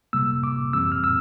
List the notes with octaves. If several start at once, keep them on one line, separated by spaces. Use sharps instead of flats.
C3 G3 A#3 E6
D6
F2 E3 G3 C4 E6
F6
E6